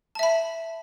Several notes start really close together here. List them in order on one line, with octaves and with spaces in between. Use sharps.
A5 E5 B5